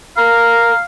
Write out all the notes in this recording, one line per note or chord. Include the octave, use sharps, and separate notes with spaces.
A#4 F5 A#5